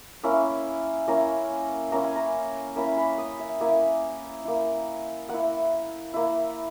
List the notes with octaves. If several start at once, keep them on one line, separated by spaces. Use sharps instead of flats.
A#3 C#4 E4
A#3 C#4 E4 A#5
A#3 C#4 E4 A#5
G#5
A#5
A#3 C#4 E4 B5
B5
D#6
E5
A#3 E4 G#5
A#3 E4
A#3 E4 F#5
A#3 E4